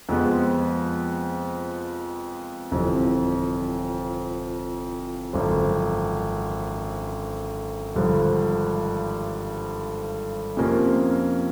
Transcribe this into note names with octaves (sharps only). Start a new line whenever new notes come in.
F2 C3 F3 G#3 B3
G1 F2 C3 E3
G#1 F#2 D3 F3
G#1 G2 D3 F3
F2 C3 F3 A#3 C#4